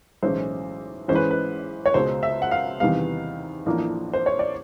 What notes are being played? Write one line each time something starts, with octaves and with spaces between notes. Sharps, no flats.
B1 A2 E3 G#3 C#4 C5
A1 G#2 E3 G#3 C#4 C5
B4
B4
C#5
C#2 B2 G#3 C5
E5
F#5
F5
E2 C3 D#3 G3 B3 F5
A1 A2 F3 A#3 D4
C5
C#5
D5